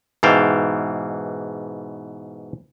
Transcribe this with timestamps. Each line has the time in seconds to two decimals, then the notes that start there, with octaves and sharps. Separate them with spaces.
0.23 G#2 B2 E3 F5 G5 A5